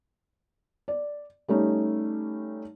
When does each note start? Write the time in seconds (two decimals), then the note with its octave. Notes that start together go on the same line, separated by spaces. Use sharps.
0.88 D5
1.48 G3 A3 C#4 D#4